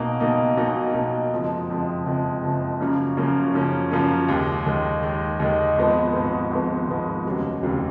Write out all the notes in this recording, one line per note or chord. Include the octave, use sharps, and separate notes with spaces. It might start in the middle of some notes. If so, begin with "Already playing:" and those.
Already playing: B1 B2 A#3 D#4
B1 B2 A#3 D#4
B1 B2 A#3 D#4
B1 B2 A#3 D#4
F#1 F2 F3 G#3
F#1 F2 F3 G#3
F#1 F2 F3 G#3
F#1 F2 F3 G#3
F#2 C#3 F3 A#3 C#4
F#2 C#3 F3 A#3 C#4
F#2 C#3 F3 A#3 C#4
F#2 C#3 F3 A#3 C#4
D#2 D#3 G#3
D#2 D#3 G#3
D#2 D#3 G#3
D#2 D#3 G#3
G#1 G#2 F3 G#3 B3
G#1 G#2 F3 G#3 B3
G#1 G#2 F3 G#3 B3
G#1 G#2 F3 G#3 B3
F1 D#2 C#3 F#3
F1 D#2 C#3 F#3